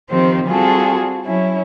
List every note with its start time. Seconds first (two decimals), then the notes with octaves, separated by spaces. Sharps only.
0.10 D#3 F3 C4 G4 C5
0.48 G3 C4 F4 F#4 G#4 A4
1.24 F#3 C#4 E4